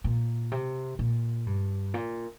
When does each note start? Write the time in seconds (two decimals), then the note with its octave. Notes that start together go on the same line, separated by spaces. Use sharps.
0.04 A#2
0.52 C3
0.99 A#2
1.46 G2
1.94 A#2